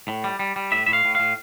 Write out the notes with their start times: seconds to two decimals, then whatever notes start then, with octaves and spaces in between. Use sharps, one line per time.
0.08 A2
0.24 G3
0.39 G3
0.56 G3
0.72 A2 E5
0.86 A2 E5
0.93 F5
1.05 A2
1.15 A2 F5